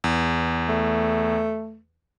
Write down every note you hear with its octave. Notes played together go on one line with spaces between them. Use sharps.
E2
A3